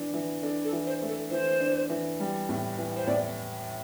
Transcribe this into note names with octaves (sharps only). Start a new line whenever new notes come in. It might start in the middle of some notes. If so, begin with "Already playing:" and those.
Already playing: E3 D4
E3
D4 A4
A4
E3
C5
A3
A4
E3 C5
D4
E3
G3
A2
E3
C5
A2 D5